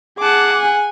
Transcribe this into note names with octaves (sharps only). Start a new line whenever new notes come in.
G#4 F#5 A5 D6
G#5